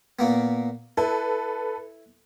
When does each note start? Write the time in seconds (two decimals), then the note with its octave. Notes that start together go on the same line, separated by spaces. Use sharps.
0.19 A#2 A#3 B3
0.97 E4 A4 B4